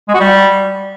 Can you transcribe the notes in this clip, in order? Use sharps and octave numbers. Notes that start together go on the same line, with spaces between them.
G#3
F#4
G3